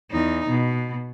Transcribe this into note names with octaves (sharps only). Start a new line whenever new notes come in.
E2 D#4
B2